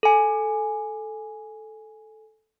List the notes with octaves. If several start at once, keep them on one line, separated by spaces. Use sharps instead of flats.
A4 G#5